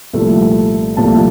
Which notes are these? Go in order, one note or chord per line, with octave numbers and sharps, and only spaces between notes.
C2 A#2 F3 A3
C2 A#2 F3 A3 A5